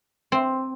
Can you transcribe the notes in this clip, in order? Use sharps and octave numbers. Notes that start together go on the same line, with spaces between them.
C4